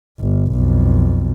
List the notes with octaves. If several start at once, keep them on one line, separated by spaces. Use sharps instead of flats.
G1
B1 F2